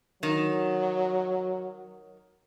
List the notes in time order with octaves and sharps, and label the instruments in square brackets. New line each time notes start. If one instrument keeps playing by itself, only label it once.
[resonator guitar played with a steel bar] D#3 [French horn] F#3